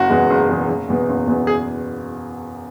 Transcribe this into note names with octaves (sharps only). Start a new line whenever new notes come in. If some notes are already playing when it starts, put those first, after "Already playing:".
Already playing: F#1 F#4
E2 B2 G#3 B3
F#1
E2 B2 G#3 B3
F#1
E2 B2 B3
F#1
E2 B2 B3
G#4